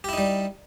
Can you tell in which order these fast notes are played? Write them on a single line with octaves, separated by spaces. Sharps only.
G4 E4 D#4 G3